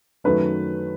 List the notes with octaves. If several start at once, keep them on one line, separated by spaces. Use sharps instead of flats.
F#2 D#3 F#3 A3 B4